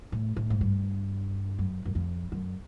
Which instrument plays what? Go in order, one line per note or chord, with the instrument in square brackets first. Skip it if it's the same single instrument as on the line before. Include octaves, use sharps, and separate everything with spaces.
[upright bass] A2
A2
G#2
G2
F#2
F#2
F2
F#2